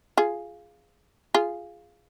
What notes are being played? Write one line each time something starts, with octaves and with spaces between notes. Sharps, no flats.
F4 G#4
F4 G#4